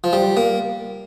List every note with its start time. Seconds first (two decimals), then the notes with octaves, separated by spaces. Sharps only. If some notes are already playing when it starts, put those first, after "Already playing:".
0.04 F3
0.13 G3
0.37 A#3